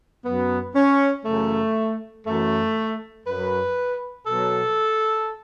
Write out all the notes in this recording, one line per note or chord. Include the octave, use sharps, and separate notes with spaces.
F#2 F#3 B3
C#4
F#2 C#3 E3 A3
F#2 E3 A3
F#2 F#3 B4
B2 A4
F#3